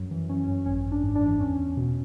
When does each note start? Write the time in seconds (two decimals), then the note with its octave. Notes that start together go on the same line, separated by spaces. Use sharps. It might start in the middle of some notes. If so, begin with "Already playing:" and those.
Already playing: F#2 F#3
0.11 E3
0.29 E3 C#4
0.48 F#2 C#4
0.66 G#1 C#4
0.85 G#1
0.92 D4
1.03 G#2
1.15 D4
1.22 E3
1.40 E2 C#4
1.59 E2
1.77 B2